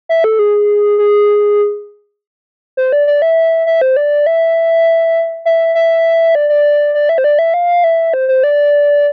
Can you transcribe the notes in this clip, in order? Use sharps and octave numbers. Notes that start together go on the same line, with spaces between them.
E5
A4
G#4
G#4
C5
D5
D5
E5
E5
C5
D5
E5
E5
E5
D5
D5
D5
E5
C5
D5
E5
F5
E5
C5
C5
D5